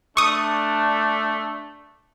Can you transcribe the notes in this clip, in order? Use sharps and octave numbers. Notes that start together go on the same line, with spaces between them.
A3 D4 C#6 D#6